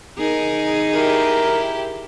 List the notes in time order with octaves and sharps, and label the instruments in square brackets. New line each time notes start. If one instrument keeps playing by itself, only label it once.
[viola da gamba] D#3 D#4 G#4 [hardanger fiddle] A#4
[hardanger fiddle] E4 G4 [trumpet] A#4